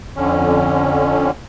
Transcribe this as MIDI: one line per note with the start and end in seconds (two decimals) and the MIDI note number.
0.16 1.31 41
0.16 1.31 50
0.16 1.31 61